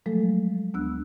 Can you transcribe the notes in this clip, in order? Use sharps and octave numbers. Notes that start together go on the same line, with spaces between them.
F3 F#3 G#3 A3 A4
D2 B3 D4 E6 F#6